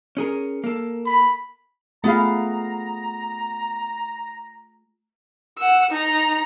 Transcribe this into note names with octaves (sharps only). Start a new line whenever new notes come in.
C#4 G#4 A#4
A#3 A4
B5
A3 B3 F4 G#4 F5 A#5
F#5 E6
D#4 A#5